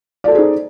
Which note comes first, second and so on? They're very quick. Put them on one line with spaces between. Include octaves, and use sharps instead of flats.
D5 A4 C5 G#4 D#4